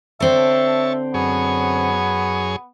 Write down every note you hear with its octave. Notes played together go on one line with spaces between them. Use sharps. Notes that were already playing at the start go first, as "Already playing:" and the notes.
D3 C4 C#5 E5 A5
F#2 B3 G#4 C#5